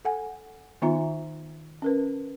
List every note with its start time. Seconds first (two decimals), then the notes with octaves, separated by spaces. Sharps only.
0.05 A4 F#5 G#5
0.82 D#3 B3 D#4 F4 E5 A#5
1.82 C#4 A#4 B4